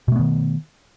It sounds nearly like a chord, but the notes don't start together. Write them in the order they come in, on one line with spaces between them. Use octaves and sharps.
B2 A3 B3 D#3